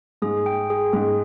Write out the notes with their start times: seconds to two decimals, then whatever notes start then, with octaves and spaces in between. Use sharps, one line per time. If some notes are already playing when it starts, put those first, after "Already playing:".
0.22 G#2 G#4
0.46 G5
0.70 G#4
0.93 G#2 G#4